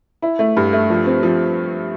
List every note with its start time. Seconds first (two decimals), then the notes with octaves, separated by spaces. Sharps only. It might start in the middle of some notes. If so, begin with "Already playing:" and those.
0.22 E4
0.39 A3
0.57 G2
0.73 A3
0.90 F3
1.06 C4
1.23 F3